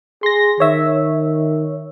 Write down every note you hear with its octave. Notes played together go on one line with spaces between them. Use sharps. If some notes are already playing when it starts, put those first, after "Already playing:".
G#4 C6 A#6
D#3 C#5 E5